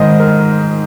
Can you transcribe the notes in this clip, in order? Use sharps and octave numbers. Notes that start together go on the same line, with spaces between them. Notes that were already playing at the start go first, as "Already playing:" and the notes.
Already playing: G#2 D#3 G#3 C5 D#5
A#4